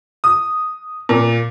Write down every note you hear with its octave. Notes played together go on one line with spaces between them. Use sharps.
D#6
A#2